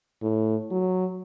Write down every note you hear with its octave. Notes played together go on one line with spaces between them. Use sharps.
A2
F#3